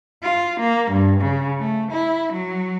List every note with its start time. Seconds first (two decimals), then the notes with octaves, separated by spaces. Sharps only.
0.22 F4
0.60 A#3
0.91 G2
1.20 C#3
1.59 A3
1.91 E4
2.32 F#3